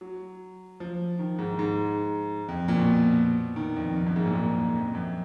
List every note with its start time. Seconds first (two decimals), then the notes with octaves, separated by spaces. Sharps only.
0.01 F#3
0.80 F3
1.19 D#3
1.39 G#2
1.59 G#2
2.48 F2
2.68 A#2
2.77 B2
3.56 D#3
3.76 F2
3.96 F2
4.06 F#2
4.16 G#2
4.26 A#2
4.35 G#2
4.75 F2
4.95 F#2